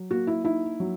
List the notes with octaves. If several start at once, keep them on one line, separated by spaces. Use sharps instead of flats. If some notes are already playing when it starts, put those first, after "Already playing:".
Already playing: F#3
A#3 F#4
E4
D#4 E4
F#3